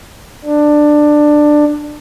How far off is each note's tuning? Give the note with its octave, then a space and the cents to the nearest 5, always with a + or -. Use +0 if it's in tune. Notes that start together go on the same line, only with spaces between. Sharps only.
D4 +15